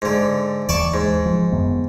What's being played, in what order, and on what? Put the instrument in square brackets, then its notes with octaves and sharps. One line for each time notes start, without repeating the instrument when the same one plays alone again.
[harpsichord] G#2 D3
[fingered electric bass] D#2 E3 [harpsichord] D5 A5 C#6
[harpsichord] G#2
[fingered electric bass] F3
F#2 D#3 B3